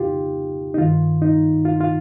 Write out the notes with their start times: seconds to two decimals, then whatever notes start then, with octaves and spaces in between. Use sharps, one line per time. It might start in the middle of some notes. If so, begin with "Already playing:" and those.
Already playing: F2 C#3 D#4 F4 G4
0.74 D#4
0.78 G2 D#3 F4
1.22 D#4
1.65 F4
1.81 F4